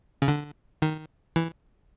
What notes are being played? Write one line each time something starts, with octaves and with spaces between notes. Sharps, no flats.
C#3
D3
D#3
E3